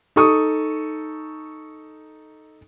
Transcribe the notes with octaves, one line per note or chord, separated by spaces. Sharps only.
D#4 A4 C#6 D#6